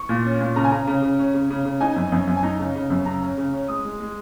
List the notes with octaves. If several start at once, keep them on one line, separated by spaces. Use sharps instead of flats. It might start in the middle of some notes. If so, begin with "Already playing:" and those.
Already playing: C#6
A#2
C#4
A#2
C#3 A#5
G#5
C#3 A#5
C#3
C#3
C#4
C#3
C#3
C#3
D#4 G#5
F#2
F#2
F#2
G#5
D#4 A#5
C#3
C#3
F#2
C#3 A#5
C#4
C#3
C#4
G#3 D#6
G#3
G#3